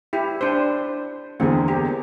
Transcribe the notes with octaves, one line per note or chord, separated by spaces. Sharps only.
E4 G4
D4 C5
E2 D3 A#3 C4 G#4
G4